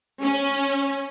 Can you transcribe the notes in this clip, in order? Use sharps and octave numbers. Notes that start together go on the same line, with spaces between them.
C#4